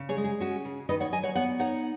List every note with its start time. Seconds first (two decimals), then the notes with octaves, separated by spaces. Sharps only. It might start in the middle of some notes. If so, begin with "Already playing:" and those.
Already playing: C#3
0.09 G#4 C#5
0.17 G#3
0.24 G#4
0.40 C#4 F#4
0.65 C#3
0.89 D#3 B4 D#5
1.00 C#5 F#5
1.12 F#3 D#5 G#5
1.23 C#5 F#5
1.35 B3 C#5 F#5
1.59 D#4 C#5 F#5